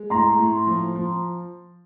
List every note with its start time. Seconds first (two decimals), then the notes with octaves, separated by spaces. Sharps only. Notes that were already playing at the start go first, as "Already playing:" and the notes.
Already playing: G#3
0.10 A2 A#5 C6
0.38 A2
0.67 F3
0.95 F3